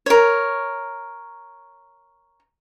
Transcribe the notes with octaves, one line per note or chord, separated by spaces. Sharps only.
A#4 C#5